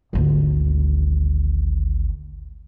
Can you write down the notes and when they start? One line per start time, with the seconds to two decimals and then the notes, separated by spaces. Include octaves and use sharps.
0.13 G#1 D2